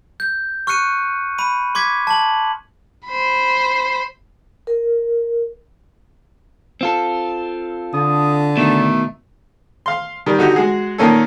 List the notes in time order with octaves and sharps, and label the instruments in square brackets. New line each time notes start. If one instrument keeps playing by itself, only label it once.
[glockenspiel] G6
C#6 F6 F#6 C#7 D#7
B5 D#7
C6 D6 G#6 B6
A5 F#7
[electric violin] C5 B5
[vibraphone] A#4
[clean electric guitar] C4 F4 A4
[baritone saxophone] D3 [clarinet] D#6
[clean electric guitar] B2 D#3 D#4 [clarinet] A3
[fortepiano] F5 C6
D#3 G3
D3 D#4 F#4 G4
G#3 F#4 G#4
A#2 D#3 A#3 C#4 A4